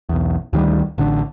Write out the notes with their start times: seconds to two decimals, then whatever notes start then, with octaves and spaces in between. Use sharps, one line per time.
0.09 B1 E2
0.53 D2 D#3 F3 G3
0.98 A1 D3 D4